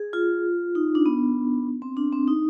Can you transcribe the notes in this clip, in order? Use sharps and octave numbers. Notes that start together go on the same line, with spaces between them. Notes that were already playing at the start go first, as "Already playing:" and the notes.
Already playing: G#4
F4
D#4
D4
B3
C4
D4
C4
D#4